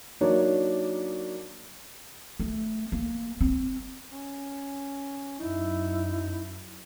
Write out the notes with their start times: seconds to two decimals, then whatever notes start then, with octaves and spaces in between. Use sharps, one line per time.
0.21 F#3 A#3 D4 D#4 C#5
2.40 A3
2.92 A#3
3.41 C4
4.12 C#4
5.39 F#2 D#4 E4